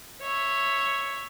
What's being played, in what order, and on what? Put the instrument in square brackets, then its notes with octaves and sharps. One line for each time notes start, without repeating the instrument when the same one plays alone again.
[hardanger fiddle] C#5 E5